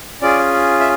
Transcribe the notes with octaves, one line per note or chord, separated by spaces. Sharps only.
C#4 F4 G#4 D5
E5